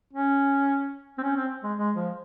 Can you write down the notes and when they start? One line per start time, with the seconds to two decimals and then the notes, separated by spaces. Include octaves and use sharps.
0.13 C#4
1.18 C4
1.23 C#4
1.37 C4
1.64 G#3
1.78 G#3
1.96 F3